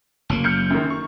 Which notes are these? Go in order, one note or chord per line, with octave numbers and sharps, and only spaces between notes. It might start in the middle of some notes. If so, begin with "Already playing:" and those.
F#1 F#3 A#3
F6 G6 C#7
F#2 D#3
C#6